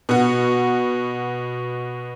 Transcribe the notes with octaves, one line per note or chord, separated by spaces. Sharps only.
B2 F#4